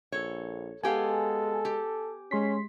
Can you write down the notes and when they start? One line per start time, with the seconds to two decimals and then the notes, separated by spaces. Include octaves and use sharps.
0.12 A#1 A4 C#5
0.83 G#3 B3 G4 A4 F5 G#5
1.65 G4
2.31 G#3 C#4 C6 B6